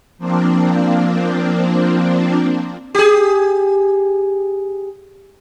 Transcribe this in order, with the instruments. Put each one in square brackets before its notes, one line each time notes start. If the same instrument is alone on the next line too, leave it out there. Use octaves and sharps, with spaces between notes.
[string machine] F3 A#3 C4 D4
[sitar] G4 G#4